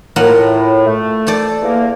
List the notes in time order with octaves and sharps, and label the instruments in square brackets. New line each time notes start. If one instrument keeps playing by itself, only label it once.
[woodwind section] A2 [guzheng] A#3 F4 F#5
[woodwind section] A3
[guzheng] A4 C5 D5
[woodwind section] E2 A#3